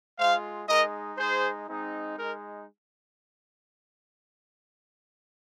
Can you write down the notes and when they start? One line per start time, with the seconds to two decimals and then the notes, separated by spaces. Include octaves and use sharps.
0.18 G#3 F4 C5 F5
0.68 G#3 D#4 A#4 D#5
1.18 G#3 D#4 G#4 C5
1.68 G#3 C4 D#4
2.18 G#3 D#4 A#4